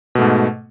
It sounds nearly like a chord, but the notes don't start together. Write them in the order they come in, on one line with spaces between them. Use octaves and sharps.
B2 A3 G#2